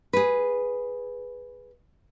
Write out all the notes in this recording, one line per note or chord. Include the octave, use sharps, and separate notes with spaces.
G#4 B4